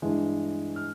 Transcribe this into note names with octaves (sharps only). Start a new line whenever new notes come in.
G2 E3 G#3
F6